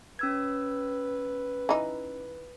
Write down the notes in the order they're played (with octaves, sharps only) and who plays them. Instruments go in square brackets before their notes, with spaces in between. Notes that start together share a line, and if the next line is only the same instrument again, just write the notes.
[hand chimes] C#4 E6 G#6 [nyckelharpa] B4
[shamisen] E3 D#4